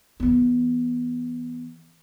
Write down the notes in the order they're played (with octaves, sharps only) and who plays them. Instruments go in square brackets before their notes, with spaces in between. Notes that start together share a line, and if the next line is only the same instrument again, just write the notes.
[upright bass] E3 B3